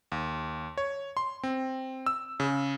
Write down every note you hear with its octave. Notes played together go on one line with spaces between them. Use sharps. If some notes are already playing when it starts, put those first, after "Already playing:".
D#2
C#5
C6
C4
E6
C#3